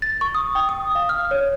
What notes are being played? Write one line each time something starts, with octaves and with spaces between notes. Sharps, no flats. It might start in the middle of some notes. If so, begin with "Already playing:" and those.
A6
C#6
D#6
G5
D#6
F5
F6
C#5